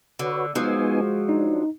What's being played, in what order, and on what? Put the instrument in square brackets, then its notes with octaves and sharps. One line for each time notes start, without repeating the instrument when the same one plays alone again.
[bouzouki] D3 [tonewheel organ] F#4 B4 C#5
[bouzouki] F3 F#3 [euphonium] G#3 [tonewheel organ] B3 D#4 G#5
[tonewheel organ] D4 [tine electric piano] D#4